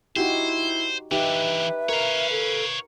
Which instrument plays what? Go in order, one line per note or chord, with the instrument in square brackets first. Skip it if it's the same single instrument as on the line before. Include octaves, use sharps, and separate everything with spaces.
[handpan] D#4 F#4 G4 [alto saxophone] E4 [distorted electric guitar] C5
[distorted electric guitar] E3 D4 [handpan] D#4 G4 [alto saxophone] B4 [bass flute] E5
[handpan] A#4 [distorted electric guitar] C#5 F5
[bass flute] A4